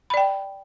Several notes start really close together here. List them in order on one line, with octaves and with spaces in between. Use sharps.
B5 D5 G5